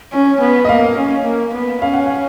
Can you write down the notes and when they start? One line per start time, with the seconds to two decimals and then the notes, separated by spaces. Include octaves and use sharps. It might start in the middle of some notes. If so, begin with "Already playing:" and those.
0.12 C#4
0.41 B3
0.65 D#5
0.69 A#3 F5
0.97 C#4
1.25 A#3
1.54 B3
1.81 C#4 F5
1.93 F#5
2.06 F5